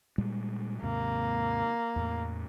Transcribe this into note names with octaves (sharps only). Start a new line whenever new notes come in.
A#2 G3 G#3
D#2 G#2 C3 A#3
E2 A2